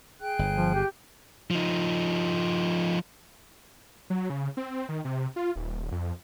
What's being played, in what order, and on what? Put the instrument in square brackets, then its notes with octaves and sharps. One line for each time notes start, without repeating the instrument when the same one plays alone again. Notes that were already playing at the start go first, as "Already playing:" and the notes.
[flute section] G#4 G5 F#6
[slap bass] G1
[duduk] F3
G4
[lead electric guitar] F3 D#4
[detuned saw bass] F#3
C#3
C4
D#3
C3
F4
D#1
F2